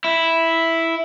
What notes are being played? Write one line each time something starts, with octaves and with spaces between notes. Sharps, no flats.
E4